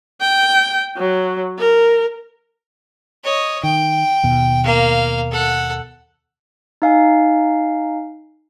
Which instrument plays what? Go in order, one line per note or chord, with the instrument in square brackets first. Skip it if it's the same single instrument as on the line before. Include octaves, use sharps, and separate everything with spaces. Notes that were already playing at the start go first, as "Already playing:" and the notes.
[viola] G5
F#3
A#4
[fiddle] C#5 D#5
[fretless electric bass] D#3 [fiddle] G5
[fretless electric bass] D#2 B2
[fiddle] A#3 F5
A4 F#5
[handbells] D#4 F5 G#5